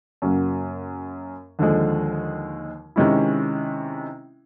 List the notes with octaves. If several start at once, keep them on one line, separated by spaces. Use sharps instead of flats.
F#2 C#3 F#3 A#3
D#2 D3 F3 G#3
C3 D#3 G#3 C#4 E4